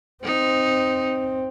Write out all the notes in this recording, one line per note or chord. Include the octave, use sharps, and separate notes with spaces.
C4 D#4